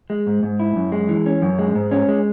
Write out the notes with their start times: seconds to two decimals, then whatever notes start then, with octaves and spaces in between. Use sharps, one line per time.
0.10 G#3
0.27 G#2
0.43 G#2
0.60 E4
0.76 F#2
0.92 G#3
1.09 E3
1.26 C#4
1.42 F#2
1.59 G#3
1.75 G#2
1.91 C#4
2.08 G#3